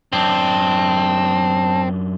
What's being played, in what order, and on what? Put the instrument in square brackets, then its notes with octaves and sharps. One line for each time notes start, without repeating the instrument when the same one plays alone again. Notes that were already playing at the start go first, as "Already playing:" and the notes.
[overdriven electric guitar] F#2 D4 [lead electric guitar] C4 [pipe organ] A5